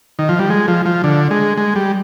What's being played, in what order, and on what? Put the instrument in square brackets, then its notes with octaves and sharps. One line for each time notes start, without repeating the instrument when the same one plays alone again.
[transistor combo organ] D#3
F3
G3
G#3
F3
F3
D3
G#3
G#3
G3